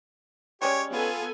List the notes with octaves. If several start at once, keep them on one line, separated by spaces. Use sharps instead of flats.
G3 G#3 C#4 G4 C#5
B3 F4 A4 G#5